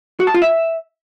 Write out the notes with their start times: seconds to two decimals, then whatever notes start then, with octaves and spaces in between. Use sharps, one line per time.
0.20 F#4
0.27 A5
0.34 F4
0.42 E5